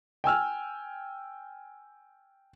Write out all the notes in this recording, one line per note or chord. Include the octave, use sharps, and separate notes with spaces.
G5 G#5 E6 F6